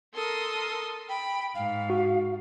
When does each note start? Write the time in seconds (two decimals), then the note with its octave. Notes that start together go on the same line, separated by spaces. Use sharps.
0.15 A4 A#4 C6 D#6
1.09 G5 B5
1.55 G#2 F5
1.90 F#4